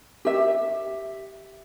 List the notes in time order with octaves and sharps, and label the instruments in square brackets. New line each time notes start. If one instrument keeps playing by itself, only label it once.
[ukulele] G4 E5